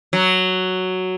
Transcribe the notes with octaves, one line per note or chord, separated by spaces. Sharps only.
F#3